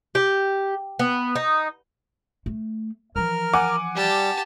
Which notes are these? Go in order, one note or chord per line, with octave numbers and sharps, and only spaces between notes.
G4
B3
D#4
A3
E3 F3 A#4 F6
F#5 G#5 D6
G3 G4 A5